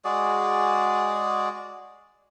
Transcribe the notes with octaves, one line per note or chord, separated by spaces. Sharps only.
G#3 F#4 G#4 D5